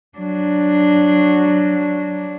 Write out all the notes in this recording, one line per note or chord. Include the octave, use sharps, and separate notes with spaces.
F#3 D4